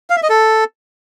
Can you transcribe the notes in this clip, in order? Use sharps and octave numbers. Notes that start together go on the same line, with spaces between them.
F5
E5
D#5
A4